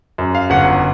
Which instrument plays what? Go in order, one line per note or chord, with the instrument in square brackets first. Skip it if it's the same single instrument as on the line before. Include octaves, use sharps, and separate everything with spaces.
[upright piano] F#2
F5
G1 F#5